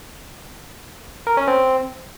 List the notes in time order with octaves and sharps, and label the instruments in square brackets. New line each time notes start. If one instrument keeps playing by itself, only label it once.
[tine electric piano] A#4
C#4
C4